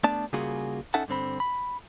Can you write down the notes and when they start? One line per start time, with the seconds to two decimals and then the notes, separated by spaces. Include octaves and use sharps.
0.04 A3 B3 D4 D5 A5
0.33 C#3 G3 A#3 F4 F#4 G#4
0.94 C#4 D#4 A4 E5 F#5 A5
1.08 G2 D3 C4 B5
1.40 B5